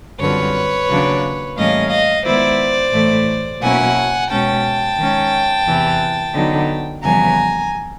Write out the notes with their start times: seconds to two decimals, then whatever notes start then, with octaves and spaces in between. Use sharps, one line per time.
0.20 F#2 D3 G3 C4 F4 B4 C#5
0.88 D#2 C#3 F#3 A#3 D4
1.57 A2 E3 G3 A#3 C#4 D#5 F5
1.90 D#5 F5
2.25 D#3 G#3 B3 E4 C5 D5
2.93 A2 E3 A3
3.61 B2 F#3 A#3 C#4 E4 F#5 G#5
4.29 B2 G#3 C#4 G5 A5
4.98 D#3 G#3 C#4
5.65 E2 C3 E3
6.34 D3 F#3 B3 D#4
7.02 F2 C#3 E3 G3 B3 G#5 A#5